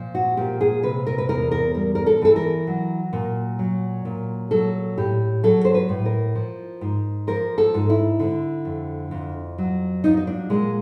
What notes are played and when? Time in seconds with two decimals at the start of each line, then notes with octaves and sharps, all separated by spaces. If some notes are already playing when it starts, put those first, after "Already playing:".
Already playing: A#2 F3
0.15 F#4
0.37 A#2 G4
0.61 G#4
0.83 C3 B4
1.07 A#4
1.18 B4
1.29 E2 A#4
1.52 A#4
1.75 G3 A#4
1.95 A#4
2.06 A4
2.22 E3 A4
2.36 A#4
2.67 F#3
3.13 A#2
3.59 F#3
4.05 A#2
4.51 F#3 A4
4.97 A2 G4
5.43 F#3 A4
5.65 C5
5.74 B4
5.89 A2
6.05 A#4
6.35 F3
6.81 G#2
7.27 F3 A#4
7.58 A4
7.74 G#2
7.90 E4
8.19 D3
8.65 F2
9.11 F2
9.58 F#3
10.04 F3 D#4
10.17 D#4
10.27 D4
10.49 A#2 G#3